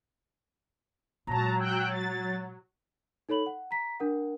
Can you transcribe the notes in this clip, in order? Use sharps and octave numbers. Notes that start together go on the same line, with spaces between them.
A#2 F#3 G#3 A5 A#5
G5 E6 F#6
A6
D#4 A4 C#5 B5 F#7
F#5
A#5 B6
D4 A#4 F#5